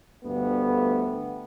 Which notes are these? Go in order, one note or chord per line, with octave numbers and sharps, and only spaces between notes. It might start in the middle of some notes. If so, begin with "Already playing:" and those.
D2 G2 A3 B3